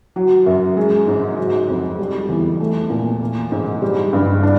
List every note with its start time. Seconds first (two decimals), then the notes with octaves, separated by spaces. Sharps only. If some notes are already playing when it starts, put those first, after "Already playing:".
0.16 F#3
0.46 F#2
0.77 G#3
1.08 G#2
1.37 F#3
1.68 F2
1.99 G3
2.29 E2
2.60 A3
2.90 A#2
3.21 A#3
3.52 G#2
3.82 G3
4.13 G2
4.43 D4